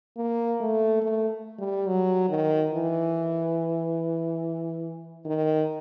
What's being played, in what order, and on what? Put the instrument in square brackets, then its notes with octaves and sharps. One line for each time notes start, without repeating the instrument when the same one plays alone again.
[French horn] A#3
A3
A3
G3
F#3
D#3
E3
D#3